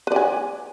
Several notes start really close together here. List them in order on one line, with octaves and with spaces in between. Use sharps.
B4 D5 G#5